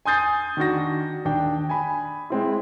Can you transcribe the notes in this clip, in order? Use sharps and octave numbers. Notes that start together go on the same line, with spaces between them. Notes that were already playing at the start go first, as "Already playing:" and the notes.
G#5 C6 D#6 G6 A6 C7
D#3 D4 F#4 A#6
D#2 D4 G5
G#5 B5
G#3 C4 E4